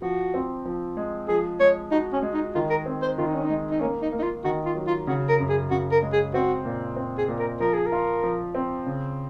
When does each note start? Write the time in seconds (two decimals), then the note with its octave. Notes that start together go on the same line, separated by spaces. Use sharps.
0.02 F3 F#4
0.34 C4
0.65 F3
0.97 G#3
1.28 F3 G#4
1.60 G#3 C#5
1.92 D#4 F#4
2.12 C#4
2.23 G#3
2.34 D#4
2.55 D#3 F4
2.70 A#4
2.86 C4
3.02 C5
3.18 D#3 F4
3.26 D#4
3.35 C#4
3.43 D#4
3.50 G#3
3.71 D#4
3.81 A#3 C#4
4.02 D#4
4.12 A#3
4.19 D#4
4.23 F4
4.44 D#3 F#4
4.65 F4
4.75 F#3
4.87 F4
5.07 C#3 F#4
5.29 A#4
5.40 F#2
5.49 G#4
5.71 C#3 F#4
5.92 A#4
6.03 G#3
6.13 G#4
6.34 C4 F#4
6.65 A#2
6.96 C4
7.18 G#4
7.28 A#2
7.39 A#4
7.60 F3 A#4
7.74 G#4
7.87 A#4
7.92 F4
8.23 F3
8.55 C4
8.86 C#3